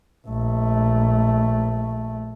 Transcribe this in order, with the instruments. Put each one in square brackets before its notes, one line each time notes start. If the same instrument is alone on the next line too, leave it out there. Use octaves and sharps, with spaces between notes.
[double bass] A#1 A3